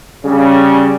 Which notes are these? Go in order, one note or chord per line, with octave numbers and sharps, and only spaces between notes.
C#3 G3